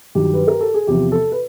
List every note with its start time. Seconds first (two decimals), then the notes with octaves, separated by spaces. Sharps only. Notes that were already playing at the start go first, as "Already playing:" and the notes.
0.15 G2 D#3 F#3 G4
0.34 B4
0.48 A#4
0.61 A4
0.74 G#4
0.87 E2 C3 F3 G4
1.12 A4
1.32 B4